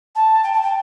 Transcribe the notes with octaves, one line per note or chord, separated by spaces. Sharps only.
A5
G5
A5
G5